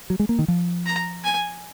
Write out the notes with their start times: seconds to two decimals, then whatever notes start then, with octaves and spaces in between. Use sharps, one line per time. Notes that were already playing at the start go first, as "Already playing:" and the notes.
0.10 F#3
0.19 G#3
0.29 A#3
0.39 D#3
0.48 F3
0.86 A#5
1.24 G#5